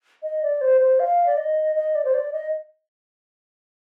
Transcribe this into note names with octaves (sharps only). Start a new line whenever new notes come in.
D#5
D5
C5
C5
F5
D5
D#5
D#5
D5
C5
D5
D#5